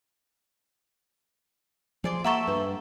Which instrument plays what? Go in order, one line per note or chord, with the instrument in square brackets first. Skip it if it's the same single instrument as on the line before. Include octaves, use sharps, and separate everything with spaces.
[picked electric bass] F3 [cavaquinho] G#4 D5 C6
[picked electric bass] A#3 [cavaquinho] A4 E5 [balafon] F#5 A#5 C#6
[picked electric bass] G2 [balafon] B4